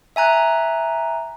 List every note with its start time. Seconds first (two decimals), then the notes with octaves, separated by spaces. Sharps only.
0.16 E5 G#5 A#5 F#6